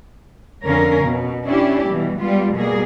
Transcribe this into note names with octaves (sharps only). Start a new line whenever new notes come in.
F2 D3 C#4 A#4 F5
B2
C#4 D4 E4 G4
B2 E3 G3
G3 G#3 B3 F4
B2 G3 A#3 G#4